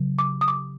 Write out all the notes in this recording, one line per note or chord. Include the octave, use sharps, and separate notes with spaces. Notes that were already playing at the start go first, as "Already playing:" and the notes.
Already playing: C#3 F#3
D6
D#6
D6